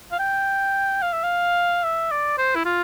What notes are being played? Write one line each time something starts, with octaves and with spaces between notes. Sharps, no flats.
F5
G5
F5
E5
F5
E5
D5
C5
E4
F4